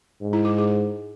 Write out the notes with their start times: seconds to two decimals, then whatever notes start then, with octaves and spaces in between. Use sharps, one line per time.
0.21 G#2
0.33 E4
0.45 G#4
0.58 G#4